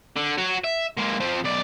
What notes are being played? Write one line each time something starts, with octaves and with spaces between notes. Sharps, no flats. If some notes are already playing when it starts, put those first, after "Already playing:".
D3
F#4 C#5
E5
G#3 A#3
F3 C4
B1 D5